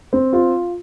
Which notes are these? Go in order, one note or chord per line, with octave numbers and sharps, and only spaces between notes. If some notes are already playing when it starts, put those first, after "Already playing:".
C4
F4